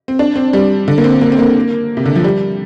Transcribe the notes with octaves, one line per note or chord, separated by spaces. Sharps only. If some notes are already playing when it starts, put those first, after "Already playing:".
C4
D4
C4
G3
D3
A#3
C4
A#3
C4
A#3
C3
D3
F3
G3